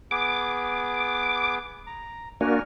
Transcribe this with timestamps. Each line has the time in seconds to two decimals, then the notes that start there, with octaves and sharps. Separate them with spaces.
0.11 B3 G#4 D6
1.87 A#5
2.41 A#3 D4 F#4 A#4 G#5 F6